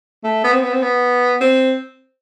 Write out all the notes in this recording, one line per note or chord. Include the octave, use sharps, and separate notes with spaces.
A3
B3
C4
B3
C4
B3
C4